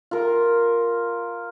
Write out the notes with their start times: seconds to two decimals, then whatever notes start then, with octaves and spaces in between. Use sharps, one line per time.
0.11 F4 A#4